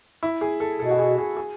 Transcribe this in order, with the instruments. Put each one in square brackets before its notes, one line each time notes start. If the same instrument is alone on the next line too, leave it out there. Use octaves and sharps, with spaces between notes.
[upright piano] E4
G#4
A4
[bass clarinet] B2 [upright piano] A4
[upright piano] F#4
G#4
G#4
G#4